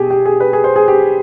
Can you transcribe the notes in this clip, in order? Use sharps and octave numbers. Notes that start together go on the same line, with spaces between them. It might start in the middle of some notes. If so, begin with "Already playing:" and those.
Already playing: B2 G4 G#4
G4
G#4
B4
G#4
C5
G#4
G4